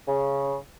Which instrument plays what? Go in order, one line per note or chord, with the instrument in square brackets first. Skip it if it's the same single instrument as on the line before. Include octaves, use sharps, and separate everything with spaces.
[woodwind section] C#3